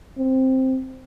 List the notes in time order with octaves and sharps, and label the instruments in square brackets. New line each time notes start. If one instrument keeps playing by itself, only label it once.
[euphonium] C4